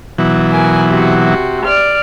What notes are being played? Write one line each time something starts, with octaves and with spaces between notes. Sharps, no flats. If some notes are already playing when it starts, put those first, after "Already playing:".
B2 E3 F#3
A#4 G#5
C3 F#4
D5 F6